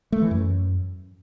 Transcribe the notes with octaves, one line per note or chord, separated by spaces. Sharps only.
A3
E3
F#2